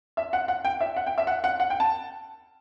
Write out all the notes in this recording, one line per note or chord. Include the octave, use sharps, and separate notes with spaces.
E5
F#5
F#5
G5
E5
F#5
G5
E5
F#5
F#5
F#5
G5
A5